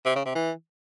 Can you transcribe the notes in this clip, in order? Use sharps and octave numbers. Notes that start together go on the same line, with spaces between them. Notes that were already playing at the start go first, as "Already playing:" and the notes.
C3
C#3
C3
E3